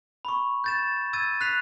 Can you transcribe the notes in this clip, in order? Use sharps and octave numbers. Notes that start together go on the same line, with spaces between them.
B5 C#6
G6 A6 E7
E6 G#6 A6 D#7
F#6 B6 C7 F7